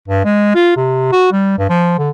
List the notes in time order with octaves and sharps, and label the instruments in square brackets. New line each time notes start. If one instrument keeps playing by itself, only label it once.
[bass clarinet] G2
G#3
F4
C3
F#4
G3
G2
F3
D3